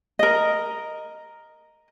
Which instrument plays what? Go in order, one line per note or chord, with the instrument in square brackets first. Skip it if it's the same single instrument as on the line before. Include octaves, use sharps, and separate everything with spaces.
[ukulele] A#4 D#5